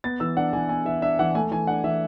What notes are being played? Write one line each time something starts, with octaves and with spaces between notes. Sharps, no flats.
B3 A6
E3 E6
D4 F#5
E3 G#5
B3 G#5
E3 E5
D4 E5
E3 F#5
A3 G#5
E3 G#5
D4 F#5
E3 E5